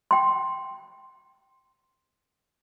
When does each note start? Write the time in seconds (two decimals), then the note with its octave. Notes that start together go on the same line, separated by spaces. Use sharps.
0.11 G5 C6